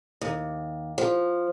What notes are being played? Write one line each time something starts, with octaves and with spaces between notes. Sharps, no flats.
D#2
F3